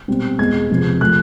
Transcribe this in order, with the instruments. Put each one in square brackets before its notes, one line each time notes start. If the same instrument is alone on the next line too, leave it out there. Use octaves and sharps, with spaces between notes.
[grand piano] B2 G3 C4
E2 B2 G#3 G#6
E2 C3 F3
F3 A3 F#6